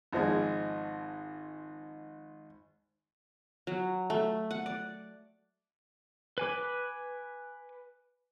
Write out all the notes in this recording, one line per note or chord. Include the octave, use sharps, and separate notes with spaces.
G#1 F3 G#3
F#3
A3
F#5
D5
B4 G#5 D6